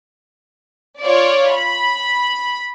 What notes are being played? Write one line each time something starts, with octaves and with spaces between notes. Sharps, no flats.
F4 C#5 D5
B5